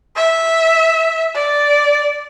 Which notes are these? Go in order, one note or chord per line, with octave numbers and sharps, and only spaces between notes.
E5
D5